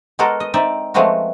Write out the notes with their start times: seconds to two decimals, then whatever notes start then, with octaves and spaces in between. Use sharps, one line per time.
0.19 G#3 B3 F#4 A4 A#4
0.40 D#5
0.54 C4 D#4 D5 E5
0.94 F3 G#3 A3 B3 C4 F#4